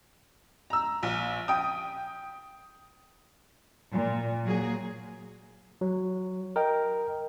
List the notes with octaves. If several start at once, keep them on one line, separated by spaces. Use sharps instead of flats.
A#5 E6
A#1
G5 D#6
A#2
F#3 A#3 G#4
F#3
A#4 D#5 G5